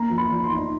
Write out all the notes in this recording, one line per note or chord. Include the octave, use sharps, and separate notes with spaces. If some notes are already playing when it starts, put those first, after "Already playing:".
Already playing: A#3 A#5
F3
B5
F3
C6
D#4